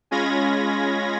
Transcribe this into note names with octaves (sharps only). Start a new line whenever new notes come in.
G#3 C#4 F4 B5 G#6 A#6